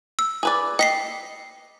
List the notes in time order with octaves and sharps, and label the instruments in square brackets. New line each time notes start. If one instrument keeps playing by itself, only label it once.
[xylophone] E6
[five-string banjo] G#4 B4 D5
[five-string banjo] D#5 [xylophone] G5 B6 C7